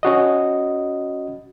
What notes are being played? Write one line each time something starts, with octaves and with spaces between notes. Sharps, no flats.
C#4 F#4 D#5